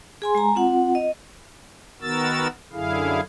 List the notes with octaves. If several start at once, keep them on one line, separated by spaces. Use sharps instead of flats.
G#4 G#5 C6
G#3 G#5 A#5
C4 F4 F#5
D#5
D#3 B3 F#4 A#4 E6 A6
F#2 D3 E4 G#4 F5